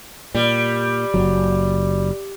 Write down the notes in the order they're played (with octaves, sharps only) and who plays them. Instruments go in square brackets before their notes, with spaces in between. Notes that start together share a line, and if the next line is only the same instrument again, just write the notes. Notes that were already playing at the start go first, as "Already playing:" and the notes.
[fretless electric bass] A#2 [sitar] G3
[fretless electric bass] F#1 C2 F#3